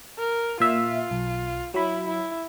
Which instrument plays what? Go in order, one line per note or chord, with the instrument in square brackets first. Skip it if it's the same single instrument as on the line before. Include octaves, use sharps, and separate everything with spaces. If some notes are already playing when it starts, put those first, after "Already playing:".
[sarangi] A#4
[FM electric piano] A#2 E5 [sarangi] F4
[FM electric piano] B1
[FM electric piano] F#3 B5 [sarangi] E4
[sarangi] E4